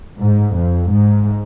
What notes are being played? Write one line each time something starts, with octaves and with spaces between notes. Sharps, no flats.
G#2
F2
G#2